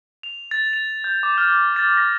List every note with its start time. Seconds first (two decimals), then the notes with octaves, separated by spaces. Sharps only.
0.23 F7
0.51 A6
0.73 F7
1.04 G6
1.23 D6
1.38 F6
1.76 A6
1.97 A#6